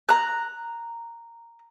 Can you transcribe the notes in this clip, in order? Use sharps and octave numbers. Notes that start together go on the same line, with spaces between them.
A#5 F#6